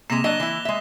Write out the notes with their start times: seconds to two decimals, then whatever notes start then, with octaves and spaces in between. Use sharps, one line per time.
0.10 C3 G#3 A#3 D6 A#6 E7
0.24 F#3 D4 D#5 F#6 A#6 G7
0.40 E3 E4
0.65 G#3 E5